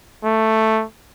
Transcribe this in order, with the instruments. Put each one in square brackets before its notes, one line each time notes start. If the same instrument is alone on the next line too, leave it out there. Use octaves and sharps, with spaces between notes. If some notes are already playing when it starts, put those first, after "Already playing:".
[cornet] A3